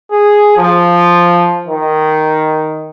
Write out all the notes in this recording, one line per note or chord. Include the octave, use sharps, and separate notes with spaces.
G#4
F3
D#3